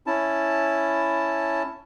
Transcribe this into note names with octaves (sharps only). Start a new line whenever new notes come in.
C#4 E4 A5